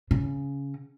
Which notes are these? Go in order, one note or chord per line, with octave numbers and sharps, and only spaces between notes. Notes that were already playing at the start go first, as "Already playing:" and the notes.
C#3